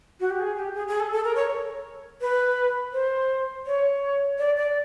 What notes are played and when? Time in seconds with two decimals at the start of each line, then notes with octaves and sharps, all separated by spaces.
0.20 F#4
0.30 G4
0.39 G#4
0.57 G4
0.75 G#4
0.88 G#4
1.00 A4
1.12 A4
1.24 A#4
1.36 C#5
2.21 B4
2.93 C5
3.67 C#5
4.38 D5
4.57 D5